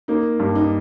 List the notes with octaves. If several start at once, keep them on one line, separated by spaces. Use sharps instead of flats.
A#3 D#4
G2
D#4